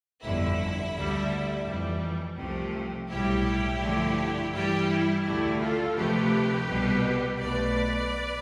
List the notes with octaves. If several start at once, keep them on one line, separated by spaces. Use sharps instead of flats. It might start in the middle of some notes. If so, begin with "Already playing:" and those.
G1 F2 D3 E4
D2 D3 G3
F2 E3 G3
C2 C3 F3 A3
B1 A2 G3 E4 G4
G2 D3 F3 A3
G2 E3 G3 E4 G4
E4
D2 D3 A3 E4 G4
F4 A4
D2 C3 F3 A3 G4 B4
C2 B2 G3
B1 B2 A3 B4 D5